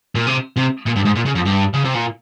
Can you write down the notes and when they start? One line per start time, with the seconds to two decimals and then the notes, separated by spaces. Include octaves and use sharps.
0.15 A#2
0.27 C3
0.57 C3
0.86 A#2
0.96 G2
1.05 G#2
1.16 A#2
1.26 C#3
1.35 F2
1.45 G2
1.74 C#3
1.84 C3
1.94 A#2